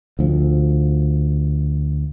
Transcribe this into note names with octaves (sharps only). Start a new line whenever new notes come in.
D2 F3